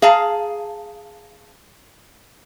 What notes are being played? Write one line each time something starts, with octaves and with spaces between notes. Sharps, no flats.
G#4 F5 A5 A#5